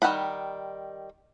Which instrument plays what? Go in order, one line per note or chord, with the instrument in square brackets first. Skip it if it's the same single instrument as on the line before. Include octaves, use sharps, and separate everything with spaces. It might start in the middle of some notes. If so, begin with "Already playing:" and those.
[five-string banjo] D#3 G3 F#5 B5